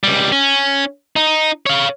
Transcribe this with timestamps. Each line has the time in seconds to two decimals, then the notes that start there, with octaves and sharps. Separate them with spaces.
0.04 C#2 G3
0.32 C#4
1.16 D#4
1.66 C#5 F5